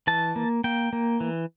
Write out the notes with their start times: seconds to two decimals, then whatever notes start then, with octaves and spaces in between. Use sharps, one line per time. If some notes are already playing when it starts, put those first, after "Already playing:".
0.07 E3 A5
0.36 A#3
0.64 A#3 G5
0.93 A#3
1.20 E3